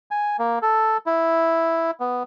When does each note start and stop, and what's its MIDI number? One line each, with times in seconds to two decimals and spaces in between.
0.11 0.37 80
0.39 0.59 58
0.62 0.97 69
1.06 1.91 64
2.00 2.23 59